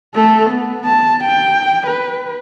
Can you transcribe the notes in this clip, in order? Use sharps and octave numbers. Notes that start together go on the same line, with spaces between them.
A3 A4
B3
A5
G5
B4